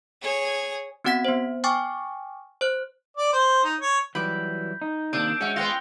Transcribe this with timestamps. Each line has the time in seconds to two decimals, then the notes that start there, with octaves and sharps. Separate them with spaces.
0.22 G#4 C#5
1.04 B3 C4 F#4 F#5 G#6 B6
1.25 B3 C5
1.64 G5 G#5 C#6 D6 F6 A6
2.61 C5 F#6
3.17 D5
3.33 C5
3.64 D#4
3.80 C#5
4.15 E3 F#3 G3 B5 D6 G6
4.82 D#4
5.13 C3 D#3 A#3 D4 D#6 E6 G6 D7
5.41 G#3 C#4 E4 F#4 C#7
5.56 B3 C#4 F4 G5 C6 F#6 A#6 F7